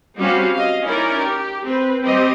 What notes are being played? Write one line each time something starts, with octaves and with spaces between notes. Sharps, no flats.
G3 C4 C#4 F#4 G4 F5
D#5 F5
C#4 D#4 E4 A#4 D5
G4
C4 B4
G3 C4 G4 D#5